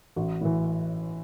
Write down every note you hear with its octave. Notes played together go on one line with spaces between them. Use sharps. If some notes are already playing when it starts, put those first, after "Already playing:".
A1 F#4
A2 E3